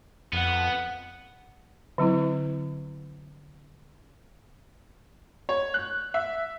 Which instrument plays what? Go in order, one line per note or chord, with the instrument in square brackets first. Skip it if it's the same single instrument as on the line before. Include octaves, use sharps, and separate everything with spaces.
[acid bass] F2 [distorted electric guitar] B3 [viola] F#5
[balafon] D3 F#3 C4 E4
[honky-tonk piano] C#5
F#6
E5